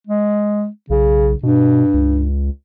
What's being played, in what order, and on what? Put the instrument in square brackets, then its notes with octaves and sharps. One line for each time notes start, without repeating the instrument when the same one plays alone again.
[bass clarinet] G#3
[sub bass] B1 [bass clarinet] C#3
[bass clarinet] G2 [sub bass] B2
[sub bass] C#2